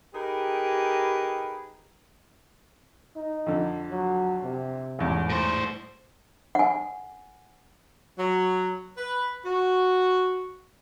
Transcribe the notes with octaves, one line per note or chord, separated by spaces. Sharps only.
D#4 G4 G#4 A#4 B4
D#4
F2 D3
F#3
C3
A1 E2 G#2
A2 C5
F#5 G#5
F#3
B4
F#4